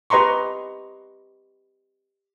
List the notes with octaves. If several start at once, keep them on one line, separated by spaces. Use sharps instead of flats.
G4 B4 D#5 A#5 C6 C#6